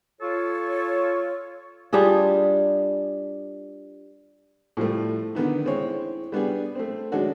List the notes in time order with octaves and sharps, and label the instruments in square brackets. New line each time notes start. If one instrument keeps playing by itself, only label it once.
[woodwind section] F4 A4 C#5
[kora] G3 D4 F4 G#4
[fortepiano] A2 F3 G3 A3
D3 D#3 B3 D#4
G#3 C4 E4 C#5
G3 B3 D4 G#4
A3 C4
D#3 G#3 C#4 D4 F#4 A4